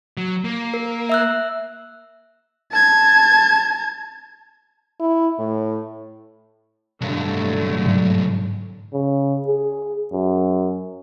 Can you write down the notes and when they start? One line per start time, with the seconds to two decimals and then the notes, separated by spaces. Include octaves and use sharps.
0.17 F#3
0.44 A#3
0.74 A#4
1.09 E5 E6 F#6
2.71 A5 G#6
5.00 E4
5.39 A2
7.01 B1 G2 D3 F#3 A3
7.86 G#2
8.93 C#3
9.47 G#4
10.13 F#2